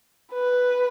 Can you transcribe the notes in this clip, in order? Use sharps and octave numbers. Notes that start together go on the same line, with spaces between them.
B4